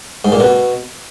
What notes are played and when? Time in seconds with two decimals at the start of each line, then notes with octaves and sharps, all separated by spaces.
0.25 G#2
0.32 A#2
0.40 B2